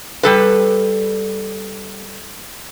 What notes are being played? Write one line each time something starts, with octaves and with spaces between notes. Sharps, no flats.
G3 A4 B4